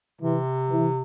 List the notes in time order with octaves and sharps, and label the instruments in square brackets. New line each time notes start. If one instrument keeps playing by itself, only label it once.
[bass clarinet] C3 [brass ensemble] E3
[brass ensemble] E3